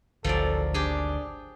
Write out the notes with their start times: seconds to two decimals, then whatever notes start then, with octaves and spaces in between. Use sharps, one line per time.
0.24 G#1 D2 F3 F#3 A4 D5
0.74 D4 G4 G#4